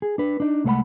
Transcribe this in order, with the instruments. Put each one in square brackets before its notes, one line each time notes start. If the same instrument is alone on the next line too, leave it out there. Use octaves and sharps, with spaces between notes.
[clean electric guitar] G#4
D4 B4
D4 D#4
C2 G#3 A3 C5 F#5 B5